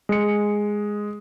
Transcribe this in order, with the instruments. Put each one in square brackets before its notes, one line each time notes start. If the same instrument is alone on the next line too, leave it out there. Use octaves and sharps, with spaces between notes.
[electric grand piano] G#3 C#7